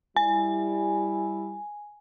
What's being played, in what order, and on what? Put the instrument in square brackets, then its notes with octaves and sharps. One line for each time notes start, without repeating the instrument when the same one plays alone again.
[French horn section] G3 E4 [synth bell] G#5